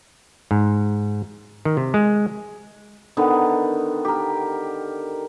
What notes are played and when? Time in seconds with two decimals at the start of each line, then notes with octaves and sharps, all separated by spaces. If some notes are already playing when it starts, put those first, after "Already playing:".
0.51 G#2
1.65 D#3
1.77 C3
1.94 G#3
3.17 D3 D#3 B3
4.05 G4 A#4